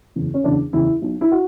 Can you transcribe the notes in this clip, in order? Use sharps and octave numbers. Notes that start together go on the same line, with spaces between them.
F#1 E2 C#3
C#4
F#1 E2 C#3 D4
F#1 E2 C#3 E4
B1 B2 F#3
E4
F#4